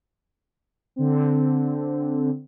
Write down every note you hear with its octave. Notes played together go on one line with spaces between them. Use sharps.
D3 C4